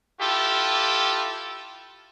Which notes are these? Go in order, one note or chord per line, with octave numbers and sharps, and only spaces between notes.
E4 F4 G4 A4